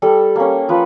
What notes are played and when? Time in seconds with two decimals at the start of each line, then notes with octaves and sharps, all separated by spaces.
0.02 G3 A4
0.36 A#3 C#4
0.69 F3 B4